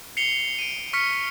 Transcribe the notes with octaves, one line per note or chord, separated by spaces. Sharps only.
C7 C#7 F7 G7
D7 D#7
C#6 F6 B6 C#7